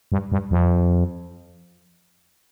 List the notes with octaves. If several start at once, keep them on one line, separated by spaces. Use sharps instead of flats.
G2
G2
F2